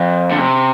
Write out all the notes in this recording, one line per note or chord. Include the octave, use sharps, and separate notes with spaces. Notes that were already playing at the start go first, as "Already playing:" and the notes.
Already playing: F2
D3
C3